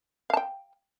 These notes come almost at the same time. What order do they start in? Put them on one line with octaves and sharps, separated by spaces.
F5 A5 G5